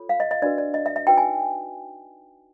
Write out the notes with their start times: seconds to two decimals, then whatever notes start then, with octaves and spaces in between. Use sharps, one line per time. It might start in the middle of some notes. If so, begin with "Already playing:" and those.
Already playing: F4 A4 C#5
0.09 F5
0.20 D#5
0.31 D#5
0.42 D4 F#4 B4 D5
0.58 D5
0.74 D#5
0.86 E5
0.96 E5
1.07 D#4 F#4 B4 G5
1.18 G#5